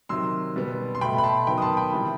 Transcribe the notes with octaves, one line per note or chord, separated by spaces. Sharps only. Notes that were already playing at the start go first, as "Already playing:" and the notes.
C3 D#3 F#3 C6 E6
B2 G3 B3
C6
B2 A3 G5 B5
B5
A5 C6
D#3 F#3 B3 G5 B5
D#6
A5 C6
G5 B5
C3 E3 G3